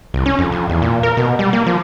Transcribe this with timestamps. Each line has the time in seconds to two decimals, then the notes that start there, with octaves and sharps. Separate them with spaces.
0.14 C2
0.26 C#4
0.39 F2
0.52 F2
0.69 E2
0.82 A#2
1.03 A#4
1.17 B2
1.39 G3
1.53 A#3
1.66 F3